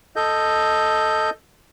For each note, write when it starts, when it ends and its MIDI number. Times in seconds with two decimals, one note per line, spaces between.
0.16 1.30 69
0.16 1.30 75
0.16 1.30 91